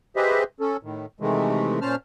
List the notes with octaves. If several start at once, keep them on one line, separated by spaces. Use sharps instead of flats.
G4 G#4 B4 C5 D#5 E5
C#4 A4
A2 D#3
C3 D#3 E3 G#3 A3
A#2 C#4 C5 A5 F6